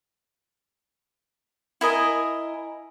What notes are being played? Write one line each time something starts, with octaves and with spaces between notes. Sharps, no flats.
E4 A#4 D#5 G#5